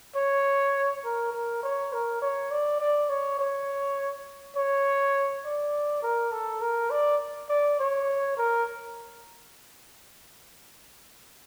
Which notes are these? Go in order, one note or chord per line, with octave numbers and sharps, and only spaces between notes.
C#5
A#4
A#4
C#5
A#4
C#5
D5
D5
C#5
C#5
C#5
D5
A#4
A4
A#4
D5
D5
C#5
A#4